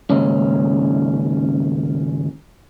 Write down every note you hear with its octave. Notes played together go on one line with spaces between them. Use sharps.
D#2 G#2 C#3 C#4